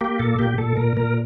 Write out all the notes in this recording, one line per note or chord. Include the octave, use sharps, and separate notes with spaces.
A#3 G4
A#2 A4
A#2 G4
A#2 A4
A#2 A#4
A#2 A#4